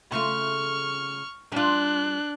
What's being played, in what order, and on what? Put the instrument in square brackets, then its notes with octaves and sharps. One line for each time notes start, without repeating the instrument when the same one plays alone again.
[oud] C#3 A3 F4 [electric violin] C#6 F6
[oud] G3 F4 [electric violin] D4 F#6